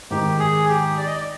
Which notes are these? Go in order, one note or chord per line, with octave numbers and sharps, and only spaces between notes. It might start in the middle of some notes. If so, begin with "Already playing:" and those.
G#2 D#3 G#3 G4
G#4
G4
D5
D#5
D5